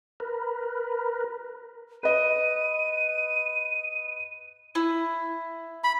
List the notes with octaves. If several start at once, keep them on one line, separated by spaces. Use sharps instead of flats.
A#4 B4
B4 D#5 D#7
E4
B5